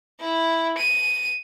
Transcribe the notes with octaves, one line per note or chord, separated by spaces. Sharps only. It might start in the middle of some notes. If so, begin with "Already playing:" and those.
E4
D#7